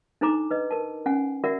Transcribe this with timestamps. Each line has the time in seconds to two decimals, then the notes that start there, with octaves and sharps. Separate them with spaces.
0.21 D4 D#4 A4 C5 A#5 D6
0.51 B4 D#5
0.71 A#4 A5
1.06 C#4 F#5 G#5
1.44 F#4 A#4 D5 E5 F#5